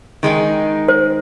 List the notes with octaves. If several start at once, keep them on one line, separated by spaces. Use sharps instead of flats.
D#3 G#3 D#4
C5